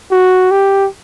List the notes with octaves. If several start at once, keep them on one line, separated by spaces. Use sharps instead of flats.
F#4
G4